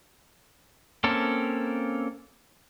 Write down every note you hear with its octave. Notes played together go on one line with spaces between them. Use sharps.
A#3 C4 C#4 A4